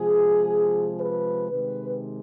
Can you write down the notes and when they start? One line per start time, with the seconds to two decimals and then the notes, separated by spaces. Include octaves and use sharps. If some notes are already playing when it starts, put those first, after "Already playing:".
Already playing: C3 F3 G#3 G#4
0.98 B4
1.50 C3 D#3 G#3 B4